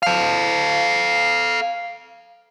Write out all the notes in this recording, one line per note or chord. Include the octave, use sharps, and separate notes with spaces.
A4 F5